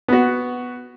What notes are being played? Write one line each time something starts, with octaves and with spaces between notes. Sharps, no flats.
B3 F#4